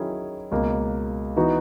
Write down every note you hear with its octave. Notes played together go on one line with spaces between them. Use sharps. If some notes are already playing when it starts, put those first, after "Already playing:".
Already playing: D#3 F#3 C#4 E4 G#4
C#2 B2 A#3
E3 B3 D#4 F#4